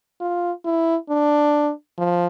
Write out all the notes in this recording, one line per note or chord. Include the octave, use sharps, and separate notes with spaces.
F4
E4
D4
F3